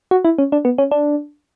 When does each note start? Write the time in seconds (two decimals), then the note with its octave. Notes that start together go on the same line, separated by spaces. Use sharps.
0.11 F#4
0.25 E4
0.38 C#4
0.52 D4
0.65 B3
0.78 C#4
0.91 D4